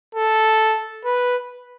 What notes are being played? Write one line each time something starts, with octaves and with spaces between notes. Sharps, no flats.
A4
B4